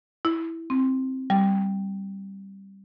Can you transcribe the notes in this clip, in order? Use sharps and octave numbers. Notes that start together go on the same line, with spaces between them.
E4
C4
G3